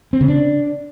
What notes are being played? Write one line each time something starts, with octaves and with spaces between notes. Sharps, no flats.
C4
C#3
D4